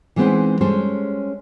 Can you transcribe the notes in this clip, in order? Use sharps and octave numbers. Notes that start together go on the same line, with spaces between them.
E3 G#3 B3 C4 D#4 C5
G3 G#3 C#4 A4 C5